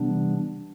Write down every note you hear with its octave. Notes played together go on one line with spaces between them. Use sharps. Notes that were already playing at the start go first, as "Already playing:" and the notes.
Already playing: C3 E3 G3 B3 D4